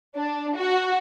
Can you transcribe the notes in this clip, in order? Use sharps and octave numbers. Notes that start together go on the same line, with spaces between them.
D4
F#4